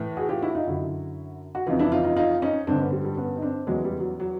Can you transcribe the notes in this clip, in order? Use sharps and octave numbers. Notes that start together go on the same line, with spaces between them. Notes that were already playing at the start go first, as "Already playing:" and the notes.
Already playing: A2 E3
F#4 G#4
F4 G4
E4 F#4
D#4 F4
F#2 D3 E4 F#4
F#4
F2 C#3 E3 D#4 F4
D4 E4
D#4 F4
D#4 F4
D#4 F4
C#4 D#4
G2 D3 C4 D4
B3 C#4
G3
G3
B3 C#4
D#4
C4 D4
E2 C#3 E3 F#3 G#3
G3
F#3
F#3